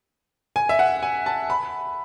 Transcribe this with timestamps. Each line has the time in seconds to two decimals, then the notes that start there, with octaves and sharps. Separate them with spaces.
0.56 G#5
0.69 E5
0.79 F#5
1.03 G#5
1.26 A5
1.50 B5